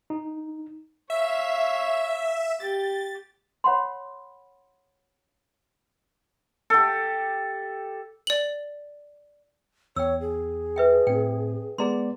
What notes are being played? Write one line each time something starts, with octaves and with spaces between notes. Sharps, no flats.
D#4
C#5 E5 F5
G4 A6
C#5 F#5 B5 C6
G4 A4
D5 F#7
E2 C#5 G5 E6
G#4
B4 E5 G5
A2 C4 G5
G#3 B3 G#4 D5 A#5 C6